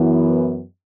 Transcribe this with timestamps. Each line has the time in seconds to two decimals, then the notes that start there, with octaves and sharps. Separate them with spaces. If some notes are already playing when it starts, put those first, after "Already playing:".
Already playing: F#2 E3 B3